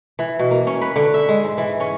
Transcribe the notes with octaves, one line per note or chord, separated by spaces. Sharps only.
E3
B2
A#3
C#4
B4
D3
E5
G#3
G#2
E3
C#4